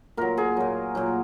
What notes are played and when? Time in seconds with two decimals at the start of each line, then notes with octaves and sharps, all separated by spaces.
0.17 A#2 F#3 A#4
0.38 G#4
0.57 A#2 F#3
0.95 A#2 F#3